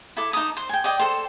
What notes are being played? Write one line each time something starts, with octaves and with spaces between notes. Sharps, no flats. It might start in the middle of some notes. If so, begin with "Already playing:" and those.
E4 A4 D6
D#4 A5 D#6
C5
G5 G#5
D5 D#5 G5
A4 C5 G5